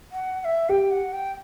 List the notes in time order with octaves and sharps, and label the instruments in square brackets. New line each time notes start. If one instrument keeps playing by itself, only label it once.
[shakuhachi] F#5
F#5
E5
[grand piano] G4 [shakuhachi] G5
[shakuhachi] F#5
G5